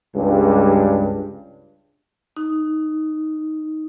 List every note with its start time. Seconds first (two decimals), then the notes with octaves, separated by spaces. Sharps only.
0.15 C#2 G2
2.37 D#4